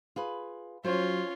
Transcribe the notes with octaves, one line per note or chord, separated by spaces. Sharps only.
F4 G#4 B4
F#3 C#4 F4 C5 C#5